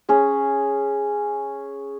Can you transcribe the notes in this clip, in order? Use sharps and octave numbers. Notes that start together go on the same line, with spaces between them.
C#4 G#4